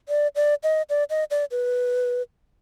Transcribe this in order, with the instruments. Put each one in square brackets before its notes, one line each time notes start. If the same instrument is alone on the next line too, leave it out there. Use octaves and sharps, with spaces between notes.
[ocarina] D5
D5
D#5
D5
D#5
D5
B4